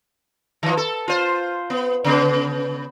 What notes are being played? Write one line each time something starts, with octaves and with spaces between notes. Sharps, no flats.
D#3 F3
A4
F4 C5
B3
C#3 B3